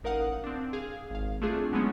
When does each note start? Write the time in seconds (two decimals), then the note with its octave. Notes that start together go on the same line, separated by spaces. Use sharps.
0.03 A1 D#4 A#4 F5 F#5 D#6
0.44 C4 D4
0.73 G#4 F5
1.10 G#1 F5
1.42 A3 C4 D4 F4 G#4
1.72 F#3 G#3 A3 B3 C#4 E4